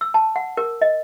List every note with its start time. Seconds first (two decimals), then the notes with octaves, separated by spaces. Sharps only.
0.01 E6
0.14 A5
0.36 F#5
0.57 A#4
0.82 D#5